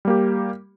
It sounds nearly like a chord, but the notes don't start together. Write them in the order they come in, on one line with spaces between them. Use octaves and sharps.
G3 A#3 G4